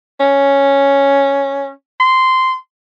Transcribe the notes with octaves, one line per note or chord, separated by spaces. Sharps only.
C#4
C6